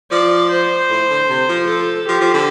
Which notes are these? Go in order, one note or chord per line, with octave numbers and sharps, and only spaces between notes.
F3 D5
C5
A2
D3
C3
F3
A4
F3 G4
F3
D3